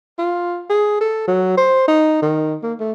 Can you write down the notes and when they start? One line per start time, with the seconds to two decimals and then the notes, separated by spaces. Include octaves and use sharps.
0.18 F4
0.70 G#4
1.00 A4
1.28 F#3
1.57 C5
1.88 D#4
2.22 D#3
2.63 A#3
2.79 A3